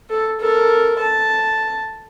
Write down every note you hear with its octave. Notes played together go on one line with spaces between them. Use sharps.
A4
A4 A#4
A5